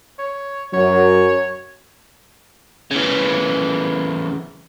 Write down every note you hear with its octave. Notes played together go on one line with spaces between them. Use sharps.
C#5
F#2 F#3 C#5
C#3 E3